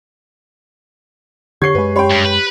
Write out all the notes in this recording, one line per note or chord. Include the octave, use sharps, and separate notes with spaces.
D3 G4 C#5 C#6 G#6 C7
F#2 G#3 B4
G4 C#5 G5 B5 C6
G2
B4